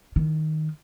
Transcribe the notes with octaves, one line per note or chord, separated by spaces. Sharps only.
D#3